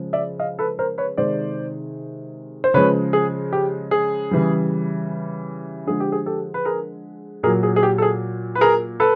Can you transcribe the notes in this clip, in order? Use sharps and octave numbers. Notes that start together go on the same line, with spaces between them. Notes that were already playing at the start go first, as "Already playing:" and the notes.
Already playing: C#3 F3 G#3
D5 E5
D#5 F5
A4 B4
A#4 C5
B4 C#5
C3 D#3 G#3 C5 D5
C5
C#3 F3 G#3 B4 C#5
G#4
G4
G#4
C#3 E3 G3
D3 F3 G#3 G#4
G4
G#4
G4 A4
B4
G#4 A#4
A#2 F#3 G#4 A#4
G#4
G#4
G4
A4
G#4
B4
G#4 A#4
A4 B4